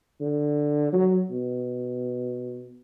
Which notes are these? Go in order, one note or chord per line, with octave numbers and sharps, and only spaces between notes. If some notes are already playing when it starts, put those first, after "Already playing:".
D3
F#3
B2